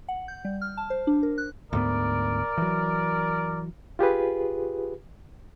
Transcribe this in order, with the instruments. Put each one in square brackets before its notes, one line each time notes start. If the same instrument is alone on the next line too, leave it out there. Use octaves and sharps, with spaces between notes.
[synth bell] F#5
G6
G3
F6
A5
C5
D4
A#4
F#6
[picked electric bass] D2 G#2 B3 [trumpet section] A#4 D5
[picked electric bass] E3 F#3
[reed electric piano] F4 G4 G#4 B4